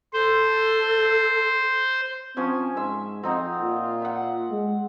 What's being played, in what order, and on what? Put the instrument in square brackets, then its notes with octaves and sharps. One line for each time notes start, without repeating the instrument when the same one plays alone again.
[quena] A4 [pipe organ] C5
[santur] F3 C#4 G#5 [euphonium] C4
[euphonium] G#2 [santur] E5 C6
[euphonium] F2 [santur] C4 D#4 F#5
[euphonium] A#2 [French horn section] F4
[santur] E5 F#5
[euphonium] G#3